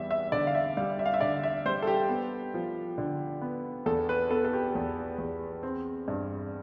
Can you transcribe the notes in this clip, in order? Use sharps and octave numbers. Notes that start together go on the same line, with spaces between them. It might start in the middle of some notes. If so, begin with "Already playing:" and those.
Already playing: E2 G3 B3 E5
E5
D3 D5
F5
E5
G3 F5
E5
F5
E5
D3 D5
E5
G3 C5
A4
G4
B3
F3
D3
B3
E2 A4
B4
B3 A4
A4
G4
E2
E2
C4
G2